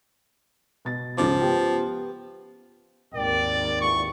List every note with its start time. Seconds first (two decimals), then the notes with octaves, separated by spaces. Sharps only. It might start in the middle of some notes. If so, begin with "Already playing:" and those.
0.85 B2 A6
1.17 C#2 F3 C#4 D6
1.41 B3 G4 G5
3.14 G#1 D#2 A#4 D5 G5
3.81 E2 A#2 C#6